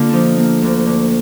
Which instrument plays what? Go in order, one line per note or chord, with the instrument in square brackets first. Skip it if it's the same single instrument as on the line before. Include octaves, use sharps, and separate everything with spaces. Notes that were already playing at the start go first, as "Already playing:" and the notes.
Already playing: [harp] D3 A#3 F4
F3 D4 D#4
A#3
D2
D3